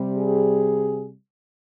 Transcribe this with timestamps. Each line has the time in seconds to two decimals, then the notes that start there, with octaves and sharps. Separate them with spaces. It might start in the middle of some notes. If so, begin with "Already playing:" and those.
Already playing: C3 G3
0.17 G#4